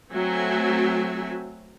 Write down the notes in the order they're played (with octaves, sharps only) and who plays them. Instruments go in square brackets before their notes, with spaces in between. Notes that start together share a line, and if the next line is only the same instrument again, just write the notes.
[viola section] F#3 A3 C4 F#4 E5 G#5